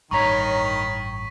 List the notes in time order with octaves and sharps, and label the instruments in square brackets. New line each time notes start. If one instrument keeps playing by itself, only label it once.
[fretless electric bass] A1 G2 [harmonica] D#3 [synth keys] C#5 A#5 B5 [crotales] C#6 B6